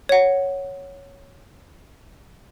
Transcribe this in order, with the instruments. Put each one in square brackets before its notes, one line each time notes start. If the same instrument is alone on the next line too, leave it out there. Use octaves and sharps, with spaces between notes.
[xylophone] C#5 F#5